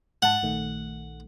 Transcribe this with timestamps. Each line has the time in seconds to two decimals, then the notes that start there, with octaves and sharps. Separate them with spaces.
0.22 G#2 F#5 A5
0.42 A#1 D#3 A3